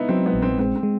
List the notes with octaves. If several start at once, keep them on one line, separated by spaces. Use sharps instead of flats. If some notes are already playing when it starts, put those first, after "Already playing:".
Already playing: B3 D#4 E4
F#3 C4
B3
A#1
C4
G#3 C4
C4
G#3